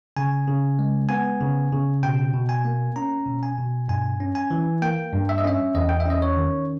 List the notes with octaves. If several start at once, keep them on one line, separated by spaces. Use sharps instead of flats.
C#3 G#5
C#3
G#3
B3 G#5
C#3
C#3
B2 G5
B2
G#5
A#3
C#4 A#5
B2
G#5
B2
G2 G#5
C#4
G#5
E3
A#3 G5
G2
E5
D#5
C#4 E5
E2 D#5
G5
E5
C#4 D#5
C#5
D#3